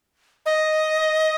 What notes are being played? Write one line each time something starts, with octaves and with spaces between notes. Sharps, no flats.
D#5